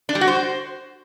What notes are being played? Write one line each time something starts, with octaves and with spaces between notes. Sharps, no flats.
D4
G3
F#4
C5